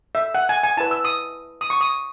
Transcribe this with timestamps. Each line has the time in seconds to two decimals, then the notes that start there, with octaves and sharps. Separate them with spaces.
0.15 E5
0.35 F#5
0.49 G#5
0.63 G#5
0.77 E4 B4 A5
0.91 E6
1.05 D#6
1.61 D#6
1.70 C#6
1.81 D#6